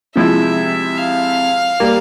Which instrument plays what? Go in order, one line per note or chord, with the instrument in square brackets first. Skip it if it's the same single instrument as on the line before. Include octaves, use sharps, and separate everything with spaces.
[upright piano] C3 F3 G#3 E4 [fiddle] E5
[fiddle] F5
[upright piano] G3 A#3